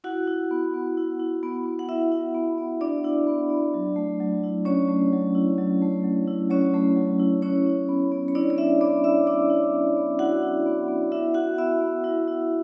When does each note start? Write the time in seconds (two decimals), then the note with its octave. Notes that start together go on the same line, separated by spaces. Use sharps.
0.04 E4 F#4 F#5
0.28 E4
0.51 B3
0.74 B3
0.97 E4
1.19 E4
1.43 B3
1.66 B3
1.79 F#5
1.89 E4 E5
2.12 E4
2.35 B3
2.58 B3
2.81 D4 E4 D5
3.04 E4
3.27 B3
3.50 B3
3.74 F#3
3.96 A3
4.20 F#3
4.43 E4
4.65 F#3 C#4 C#5
4.88 A3
5.13 F#3
5.35 E4
5.58 F#3
5.82 A3
6.04 F#3
6.28 E4
6.50 F#3 C#4 C#5
6.74 A3
6.96 F#3
7.19 E4
7.42 C#4 E4 C#5
7.66 E4
7.89 B3
8.12 B3
8.28 C#5
8.35 D4 E4 D5
8.50 D5
8.58 E4 E5
8.81 B3 D5 D6
9.04 B3 E5 E6
9.27 E4 D5 D6
9.50 E4
9.74 B3
9.97 B3
10.19 E4 F#4 F#5
10.43 E4
10.66 B3
10.88 B3
11.12 E4 E5
11.34 E4 F#4 F#5
11.58 B3 E5 E6
11.80 B3
12.04 E4
12.28 E4